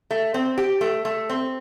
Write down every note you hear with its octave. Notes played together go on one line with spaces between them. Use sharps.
A3
C4
G4
A3
A3
C4